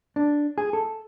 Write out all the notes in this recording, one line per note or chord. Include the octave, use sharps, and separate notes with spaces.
D4
G#4
A4